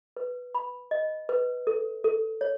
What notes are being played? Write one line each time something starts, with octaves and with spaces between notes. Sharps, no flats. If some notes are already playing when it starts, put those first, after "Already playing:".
B4
B5
D#5
B4
A4
A4
C#5